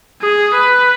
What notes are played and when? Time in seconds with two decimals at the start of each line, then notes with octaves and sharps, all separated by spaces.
0.22 G#4
0.55 B4